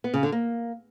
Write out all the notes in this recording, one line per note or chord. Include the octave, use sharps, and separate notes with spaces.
B3
C#3
D3
A#3